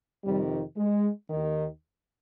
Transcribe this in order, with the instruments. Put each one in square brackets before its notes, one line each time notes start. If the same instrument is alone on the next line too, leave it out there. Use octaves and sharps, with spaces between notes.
[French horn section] F2 C3 D#3 G3
G#3
D#2 D#3